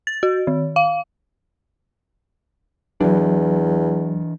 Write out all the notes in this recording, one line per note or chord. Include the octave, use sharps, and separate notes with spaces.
A6
F#4
D#3
F5
E2 E3 F#3 D4